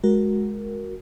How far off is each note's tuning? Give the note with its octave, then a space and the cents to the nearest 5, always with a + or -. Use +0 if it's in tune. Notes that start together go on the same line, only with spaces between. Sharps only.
G#3 +10 F#4 -5 A#4 +5